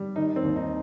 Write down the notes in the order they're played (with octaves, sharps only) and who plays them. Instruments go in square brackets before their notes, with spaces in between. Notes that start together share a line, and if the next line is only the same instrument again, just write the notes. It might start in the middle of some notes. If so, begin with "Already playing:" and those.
Already playing: [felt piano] G3
D#3 D#4
C4
D#2
D#4